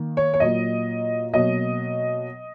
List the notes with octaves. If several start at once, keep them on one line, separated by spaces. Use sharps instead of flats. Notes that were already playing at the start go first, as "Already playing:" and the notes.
Already playing: D#3 A#3
C#5
C#5
A#2 F#3 A#3 D#5
B2 F#3 A#3 D#5